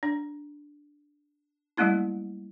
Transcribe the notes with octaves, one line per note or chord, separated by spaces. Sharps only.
D4
F#3 G3 A3 A#3 C#4 E4